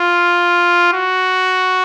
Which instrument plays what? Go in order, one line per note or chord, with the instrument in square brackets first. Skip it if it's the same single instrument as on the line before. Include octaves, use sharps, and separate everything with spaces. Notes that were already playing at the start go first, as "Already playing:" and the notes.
Already playing: [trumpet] F4
F#4